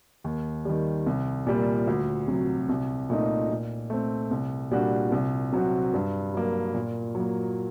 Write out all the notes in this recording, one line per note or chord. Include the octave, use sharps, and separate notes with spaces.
D#2
D#3 G3
C2
A#2 G3 A#3
D2
C3 F#3
C2
A#2 A3 D#4
A#2
A3 C4
C2
A#2 G3 D4 F#4
C2
C3 F#3 C4 F#4
G2
F#3 A#3
A#2
F#3
A#3